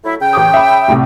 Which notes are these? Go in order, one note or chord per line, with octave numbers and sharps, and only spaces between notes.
F#3 A3 E4
C#3 G5
A1 D6 D#6
E5 B5
C2 A2 C3